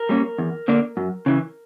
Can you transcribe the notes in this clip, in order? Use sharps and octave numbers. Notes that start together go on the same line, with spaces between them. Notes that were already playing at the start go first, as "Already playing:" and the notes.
Already playing: A#4
G3 A#3 C#4
E2
D3 A#3 D4
F#2
C#3 E3